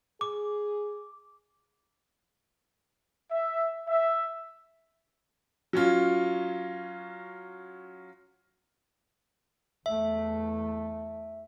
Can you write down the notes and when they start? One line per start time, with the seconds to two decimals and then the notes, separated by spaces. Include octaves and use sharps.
0.21 G#4 D6
3.31 E5
3.88 E5
5.73 F#3 C#4 F4
9.86 E2 A3 E5